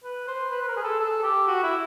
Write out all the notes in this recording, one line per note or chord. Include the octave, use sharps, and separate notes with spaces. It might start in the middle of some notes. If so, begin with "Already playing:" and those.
B4
C5
B4
B4
A#4
G#4
A4
A4
G4
F#4
E4